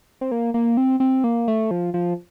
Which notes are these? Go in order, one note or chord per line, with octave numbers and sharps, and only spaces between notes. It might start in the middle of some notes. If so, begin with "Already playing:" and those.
C4
A#3
A#3
C4
C4
A#3
A3
F3
F3